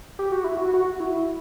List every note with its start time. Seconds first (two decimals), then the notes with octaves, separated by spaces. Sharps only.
0.19 G4
0.32 F#4
0.44 E4
0.57 F#4
0.74 F#4
1.00 E4